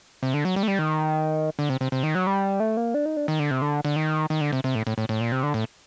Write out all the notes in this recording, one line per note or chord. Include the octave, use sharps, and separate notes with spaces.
C3
D3
F#3
G3
A3
G3
D#3
D3
C3
C3
C3
D#3
F#3
G3
A3
A#3
D4
D#4
D4
D#3
D3
C3
D3
D3
D#3
D#3
D3
C3
C3
A2
A2
A2
A2
A#2
C3
D3
A2